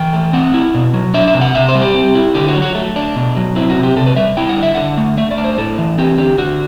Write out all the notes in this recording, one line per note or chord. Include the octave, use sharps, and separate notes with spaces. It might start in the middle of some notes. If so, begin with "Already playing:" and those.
Already playing: E3 G5
A3
C4 F#5
E4
B2
F#3
D4 E5
E5
C3
F#5
C3 E5
C5
G3
G4
C4
E4
D3 G4
F#4
F#3
F#4
A3
D4
B2
F#3
C4 E4
F#4
C3
G4
C3 A4
B4
G3 E5
E4 G5
F#5
D3
E5
D3 F#5
A3
A3 E5
D5
D4
C5
A2 A4
E3
C4 G4
D3 G4
D3 F#4